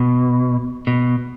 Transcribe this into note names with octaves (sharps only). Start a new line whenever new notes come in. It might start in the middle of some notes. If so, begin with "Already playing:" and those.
Already playing: B2
B2